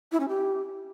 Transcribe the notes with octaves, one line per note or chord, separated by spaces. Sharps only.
E4
C#4
G4